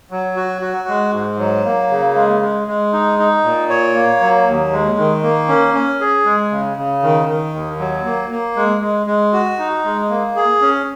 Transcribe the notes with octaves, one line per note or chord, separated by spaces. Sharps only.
F#3
F#4
F#4
G#3
G#2
F#3
A#3
C#3
G#3
G#3
G#3
D#4
D#4
A#2
C#5
A#3
F#3
D#2
G#3
D#3
A#3
C#4
C#4
G#4
G#3
C#3
C#3
D#3
D#3
D#2
F#3
A#3
A#3
G#3
G#3
G#3
F#4
D#4
G#3
A#3
G#4
C#4